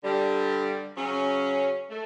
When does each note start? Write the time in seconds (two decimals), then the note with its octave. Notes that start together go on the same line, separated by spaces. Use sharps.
0.04 G2 D3 G3
0.97 C#3 F#3 C#4
1.90 A3